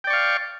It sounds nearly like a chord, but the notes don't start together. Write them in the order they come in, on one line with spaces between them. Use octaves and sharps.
G5 D5 C#6 F5